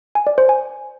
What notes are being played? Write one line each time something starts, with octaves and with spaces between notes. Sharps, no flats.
G#5
D5
C5
G#5